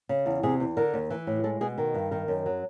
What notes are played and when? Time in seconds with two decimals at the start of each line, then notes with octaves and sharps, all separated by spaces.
0.09 C#3
0.26 E2
0.43 C3 G#4
0.60 E2
0.77 D3 A#4
0.94 D#2
1.10 E3
1.27 A2
1.44 G#3 A4
1.61 B2 G#4
1.78 D#3
1.94 G2
2.11 D#3 A#4
2.28 F#2
2.46 F#3